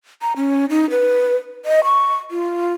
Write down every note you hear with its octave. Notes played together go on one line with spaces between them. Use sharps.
A#5
C#4
D#4
B4
D#5
C#6
F4